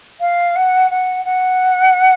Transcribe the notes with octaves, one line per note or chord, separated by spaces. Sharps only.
F5
F#5
F#5
F#5